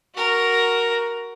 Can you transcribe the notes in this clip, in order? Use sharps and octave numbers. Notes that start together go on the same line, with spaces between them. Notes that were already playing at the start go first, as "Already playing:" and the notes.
F#4 A#4